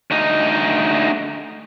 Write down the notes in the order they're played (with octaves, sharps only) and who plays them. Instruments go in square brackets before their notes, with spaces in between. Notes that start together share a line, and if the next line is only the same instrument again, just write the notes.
[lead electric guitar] D2 D#4